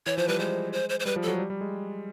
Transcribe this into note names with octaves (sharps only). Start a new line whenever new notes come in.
E3 C#5
F3 C5
G3 B4
G#3 C5
C5
C5
C5
G3 B4
F3
A4
F#3
G3
G3
G#3